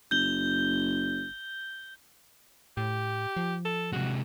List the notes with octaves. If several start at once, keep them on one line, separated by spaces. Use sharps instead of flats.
F#1 G6 G7
A2 G4
F3
A4
C3 G#3 F#4